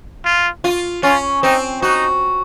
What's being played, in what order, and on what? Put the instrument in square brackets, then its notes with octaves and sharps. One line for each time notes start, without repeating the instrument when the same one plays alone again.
[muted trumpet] F4
[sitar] F4
[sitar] C#4 [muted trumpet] F4
[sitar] C4 [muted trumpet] D#4
[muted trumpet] D#4 [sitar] F#4